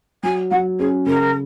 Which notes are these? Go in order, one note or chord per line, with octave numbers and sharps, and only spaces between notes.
F#3 G#5
F#3 F#5
C#4 G#4
C#3 A#4